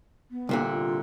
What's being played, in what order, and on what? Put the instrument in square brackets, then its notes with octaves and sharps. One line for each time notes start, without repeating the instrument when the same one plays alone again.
[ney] B3
[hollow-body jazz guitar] C2 A#2 D3
[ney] F4